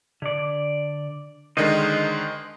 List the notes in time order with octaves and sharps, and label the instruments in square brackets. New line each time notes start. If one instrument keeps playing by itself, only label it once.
[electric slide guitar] D3 D5
[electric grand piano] D3 D#3 G#3 [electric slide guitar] A#4 C5 D#5